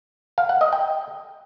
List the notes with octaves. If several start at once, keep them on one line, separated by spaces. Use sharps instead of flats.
F5
F#5
D#5
G5